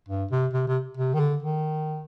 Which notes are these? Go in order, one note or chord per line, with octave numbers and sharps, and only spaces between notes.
G2
C3
C3
C3
C3
D#3
D3
D#3